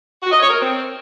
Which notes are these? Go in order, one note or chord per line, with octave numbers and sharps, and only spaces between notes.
F#4
D#5
C#5
A#4
C4